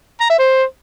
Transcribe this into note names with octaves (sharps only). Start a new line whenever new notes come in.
A#5
E5
C5